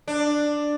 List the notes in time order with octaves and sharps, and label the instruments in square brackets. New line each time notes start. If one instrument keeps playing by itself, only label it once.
[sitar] D4